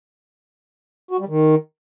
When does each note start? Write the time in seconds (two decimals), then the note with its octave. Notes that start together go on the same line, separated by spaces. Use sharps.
1.11 F#4
1.20 G3
1.28 D#3